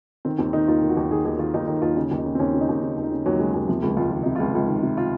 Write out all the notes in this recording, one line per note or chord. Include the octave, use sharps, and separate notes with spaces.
D#3 C4
D#2 C4
D#3 D#4
D#2 F4
D#3
F#4
D#2
D#3 G#4
D#2 G#4
D#3 F4
D#2 D#4
D#3 D#4
D#2 F4
C#3 D#4
D#2
D#4
C#3
C4
D#2 C#4
C#3
D#4
D#2
C#3
D#2
D#4
C#3
D#2 F#3
C#3 G#3
D#2 F#3
C3 F3
C#2
C#2 F4
D#3 F4
C3 D#4
C#2 F4
C#2
D#3
C3
F4